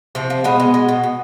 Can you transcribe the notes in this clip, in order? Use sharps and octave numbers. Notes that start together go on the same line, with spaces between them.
C3 F3 C4
F3
B2 G#3 B3
G#3
G#3
B2
B2